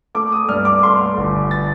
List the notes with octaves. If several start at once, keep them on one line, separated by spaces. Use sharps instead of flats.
A3 D6
D#6
G2 F6
D6
A3 C6
G1
A6